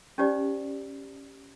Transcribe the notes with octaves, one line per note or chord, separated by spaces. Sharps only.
C#4 D#4 G4 C5 D5